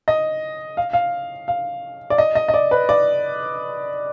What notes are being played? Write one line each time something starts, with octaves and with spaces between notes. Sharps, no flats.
D#5
F5
F5
F5
D5
D#5
D#5
D#5
D5
B4
D5